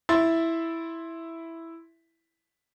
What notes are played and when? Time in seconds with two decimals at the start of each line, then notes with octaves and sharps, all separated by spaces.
0.09 E4 E5 C6 A6